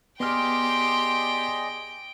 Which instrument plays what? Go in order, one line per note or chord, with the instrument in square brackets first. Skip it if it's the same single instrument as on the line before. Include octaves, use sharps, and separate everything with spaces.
[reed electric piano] B3 F6 [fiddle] G4 C6 [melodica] G#4 D5 D#5 [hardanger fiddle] G5